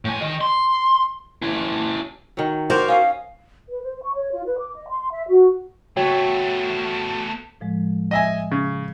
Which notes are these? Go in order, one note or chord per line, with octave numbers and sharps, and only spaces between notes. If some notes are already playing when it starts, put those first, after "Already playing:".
A2 G#5
D#3 D#5
C6
C#4 E4
D#3 F#3
F#4 A#4 C5 D5 F5
C#4 D#5 F5
B4
C5
C#6
C#5
F4
B4
D6
D#5
C6
E5
F#4
A3 B3 F#4 C#5 G5
A2 F3 G#3
D#5 E5 G#5
C#3